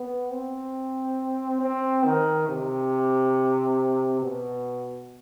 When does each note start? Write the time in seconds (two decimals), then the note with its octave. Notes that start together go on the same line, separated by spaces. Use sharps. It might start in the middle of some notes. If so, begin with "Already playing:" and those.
Already playing: B3
0.31 C4
1.61 C4
2.05 D#3
2.48 C3
4.22 B2